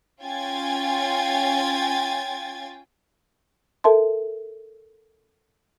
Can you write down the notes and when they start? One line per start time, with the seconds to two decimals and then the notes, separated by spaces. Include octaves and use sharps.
0.22 C#4 F4 G5 G#5 G#6 A6
3.84 A4 A#4 E5 A5 C6